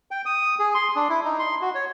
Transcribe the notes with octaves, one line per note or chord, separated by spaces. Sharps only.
G5
D#6
G#4
C6
D4
E4
D#4
C6
F#4
C#5